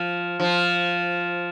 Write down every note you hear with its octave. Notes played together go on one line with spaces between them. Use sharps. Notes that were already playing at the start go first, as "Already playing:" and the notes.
Already playing: F3
F3